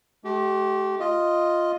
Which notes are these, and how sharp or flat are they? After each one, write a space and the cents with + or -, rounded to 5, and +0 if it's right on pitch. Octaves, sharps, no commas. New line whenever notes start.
A3 -45 G4 -30
F4 +0 D#5 +0